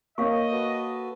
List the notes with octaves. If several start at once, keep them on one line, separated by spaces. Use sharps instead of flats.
A#3 C#5 D#5 F5 C#6
F#4 A4 B4